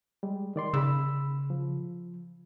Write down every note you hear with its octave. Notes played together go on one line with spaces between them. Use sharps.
G3 G#3
D#3 D5 C6
C#3 B5 E6
F3